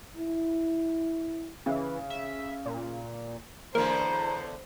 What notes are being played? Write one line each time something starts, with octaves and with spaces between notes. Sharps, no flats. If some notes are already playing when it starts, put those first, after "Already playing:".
E4
C#3 E3
E5
A#2
E2 A2 D3 A#3 C5 A#5